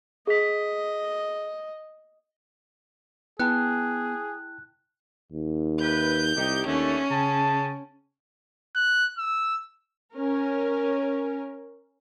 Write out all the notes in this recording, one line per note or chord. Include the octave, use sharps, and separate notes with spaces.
G#4 D#5 B6
B3 E4 G#4 G5 A5 F#6
D#2
C3 B4 G6
C2 D#4 G4
D#2 D3 A3 C#4
C#3 G#4 G5 A5
F#6
E6
C#4 A#4